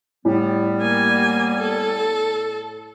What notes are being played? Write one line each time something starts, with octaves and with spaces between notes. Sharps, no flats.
A2 G3 B3
A#3 G#5
A4